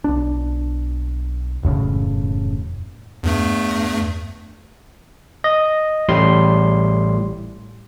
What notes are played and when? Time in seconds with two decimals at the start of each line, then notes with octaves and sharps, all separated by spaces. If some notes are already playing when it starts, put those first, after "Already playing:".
0.04 B1 D4
1.63 E1 F#2 A2 C#3
3.23 E2 G2 A3
5.44 D#5
6.09 A1 A2 G3 C6